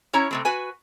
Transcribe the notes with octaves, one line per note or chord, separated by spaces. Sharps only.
C#4 E4 C#5 A#5
C3 A3 C4
F#4 B4 G#5